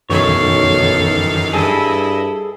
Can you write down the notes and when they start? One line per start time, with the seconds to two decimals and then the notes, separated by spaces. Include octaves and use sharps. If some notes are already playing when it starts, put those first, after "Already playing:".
0.10 B1 F#2 D#3 E3 A4 C#5 F5
1.53 G2 E4 G#4 A4 D#5